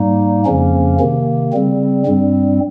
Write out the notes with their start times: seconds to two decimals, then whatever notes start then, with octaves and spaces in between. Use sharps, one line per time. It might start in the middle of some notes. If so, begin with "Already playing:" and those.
Already playing: G#2 G3 A#3 D#4
0.45 F2 C#3 F3 A#3 C#4
0.99 C3 D#3 A#3
1.52 C#3 G3 C4
2.06 G2 G3 C4